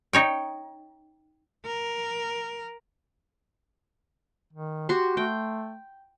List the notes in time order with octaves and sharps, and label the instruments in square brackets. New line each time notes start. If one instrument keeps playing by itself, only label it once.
[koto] D#4 C#5 G5
[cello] A#4
[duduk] D#3
[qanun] F#4 C6 [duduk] G4
[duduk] A3 [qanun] G5